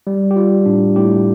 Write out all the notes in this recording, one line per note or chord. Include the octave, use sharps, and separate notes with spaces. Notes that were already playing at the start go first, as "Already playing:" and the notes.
G3
G4
G3 F4
A2 D4
A2 G4